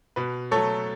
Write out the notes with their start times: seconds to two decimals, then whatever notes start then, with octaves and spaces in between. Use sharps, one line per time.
0.16 B2 B4
0.51 F#3 A3 A4 C#5